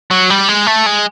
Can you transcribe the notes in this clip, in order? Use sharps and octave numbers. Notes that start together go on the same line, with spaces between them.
F#3
G3
G#3
A3
G#3